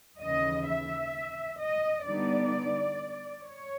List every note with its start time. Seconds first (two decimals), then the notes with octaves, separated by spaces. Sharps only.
0.23 D#2 C#3 E3 D#5
0.69 E5
1.60 D#5
2.05 D3 G3 B3 D#4 D5
3.43 C#5